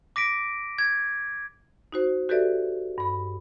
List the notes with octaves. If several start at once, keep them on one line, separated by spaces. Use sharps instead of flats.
D6 A#6 B6 D7
G#6
D#4 F#4 C5
F#4 G4 A4 B4 D5 E5
G2 B5